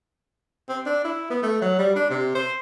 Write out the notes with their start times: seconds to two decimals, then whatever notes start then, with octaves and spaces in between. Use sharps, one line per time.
0.69 C4
0.86 D4
1.04 E4
1.30 B3
1.43 A3
1.62 F#3
1.79 G3
1.96 D4
2.10 C3
2.35 C5